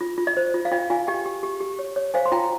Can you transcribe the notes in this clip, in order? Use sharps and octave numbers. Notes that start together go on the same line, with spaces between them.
F4
F4
D#5
C5
F4
F5
F4 D#5 G5
F4 F5 G#5
G4 D#5 G5
G4
G4
G4
C#5
C#5
C5 F5 G#5
C6
F4 G5 A#5